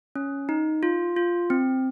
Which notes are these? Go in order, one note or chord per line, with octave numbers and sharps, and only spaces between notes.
C#4
D#4
F4
F4
C4